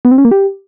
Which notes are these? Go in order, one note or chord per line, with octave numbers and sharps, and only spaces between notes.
B3
C4
C#4
A#3
G4